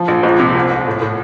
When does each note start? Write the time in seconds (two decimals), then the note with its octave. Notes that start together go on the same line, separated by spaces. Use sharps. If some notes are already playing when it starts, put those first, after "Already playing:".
Already playing: F3
0.08 A#1
0.23 C#2
0.39 C3
0.55 C2
0.71 C2
0.87 A2
1.02 A2